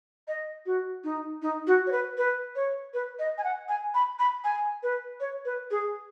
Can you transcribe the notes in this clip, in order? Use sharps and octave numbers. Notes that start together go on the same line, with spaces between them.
D#5
F#4
D#4
D#4
F#4
C#5
B4
B4
C#5
B4
D#5
G#5
F#5
G#5
B5
B5
G#5
B4
C#5
B4
G#4